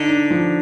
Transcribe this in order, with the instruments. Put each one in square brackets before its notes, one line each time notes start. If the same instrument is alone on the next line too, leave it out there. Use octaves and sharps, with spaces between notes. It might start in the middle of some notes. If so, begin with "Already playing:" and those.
Already playing: [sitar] D3 [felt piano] D#4
[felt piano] D4
F3